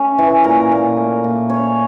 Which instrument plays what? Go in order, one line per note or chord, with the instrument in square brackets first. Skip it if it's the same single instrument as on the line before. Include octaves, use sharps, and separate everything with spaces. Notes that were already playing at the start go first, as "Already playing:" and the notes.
Already playing: [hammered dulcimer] A3 C#4
E3
A#2 A#4
A#2
A3
A#2
C#4 C#5